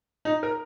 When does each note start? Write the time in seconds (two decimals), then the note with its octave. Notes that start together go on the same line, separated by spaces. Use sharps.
0.25 D#4
0.43 A#4